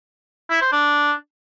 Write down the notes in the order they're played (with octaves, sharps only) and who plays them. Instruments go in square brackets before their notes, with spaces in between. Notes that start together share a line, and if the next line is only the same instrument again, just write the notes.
[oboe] E4
C5
D4